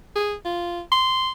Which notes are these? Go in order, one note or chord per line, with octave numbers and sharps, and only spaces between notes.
G#4
F4
C6